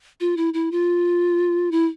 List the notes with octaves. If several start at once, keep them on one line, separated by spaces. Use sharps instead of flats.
F4
E4
E4
F4
E4